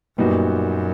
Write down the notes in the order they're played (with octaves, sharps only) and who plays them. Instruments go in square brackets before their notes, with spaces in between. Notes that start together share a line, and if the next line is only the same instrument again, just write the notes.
[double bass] F#2 [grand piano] A#2 G3 B3 D#4 F#4